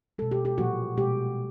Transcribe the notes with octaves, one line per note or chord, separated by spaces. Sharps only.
B2 G#3 A4
G4
G4
A#2 F3 A#3 F#4
B2 G#3 G4